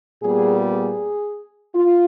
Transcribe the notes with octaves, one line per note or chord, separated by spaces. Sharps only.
A#2 G3 B3 G#4
G#4
F4